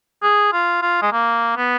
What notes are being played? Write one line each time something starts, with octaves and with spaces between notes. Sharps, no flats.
G#4
F4
F4
G#3
A#3
B3